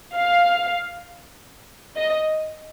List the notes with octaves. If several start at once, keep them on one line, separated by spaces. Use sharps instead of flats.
F5
D#5